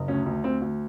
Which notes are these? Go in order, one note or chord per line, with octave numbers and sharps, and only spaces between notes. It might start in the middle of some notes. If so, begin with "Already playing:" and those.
Already playing: F#1
D2 C#4
D2
D2 C4
D2